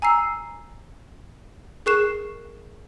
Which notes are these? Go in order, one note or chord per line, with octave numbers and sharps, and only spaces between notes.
G#5 A#5 E6 C7
G#4 A#4 C#6 F#6 C7 E7